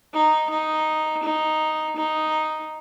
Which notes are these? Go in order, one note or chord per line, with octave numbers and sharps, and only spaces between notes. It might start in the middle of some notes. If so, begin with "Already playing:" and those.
D#4
D#4
D#4
D#4